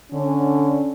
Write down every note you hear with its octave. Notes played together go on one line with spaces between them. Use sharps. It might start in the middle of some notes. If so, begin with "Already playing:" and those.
D3 C#4